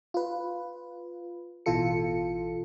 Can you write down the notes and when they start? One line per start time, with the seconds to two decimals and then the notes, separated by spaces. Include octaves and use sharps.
0.14 F4 B4
1.66 A1 B2 E3 F4 A4 C#7